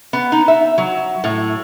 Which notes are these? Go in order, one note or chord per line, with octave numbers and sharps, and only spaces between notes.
B3
D#4
E5
F#3
A2